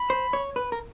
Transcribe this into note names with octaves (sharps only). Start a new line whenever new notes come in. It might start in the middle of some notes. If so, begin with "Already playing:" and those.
Already playing: B5
C5
C#5
B4
A#4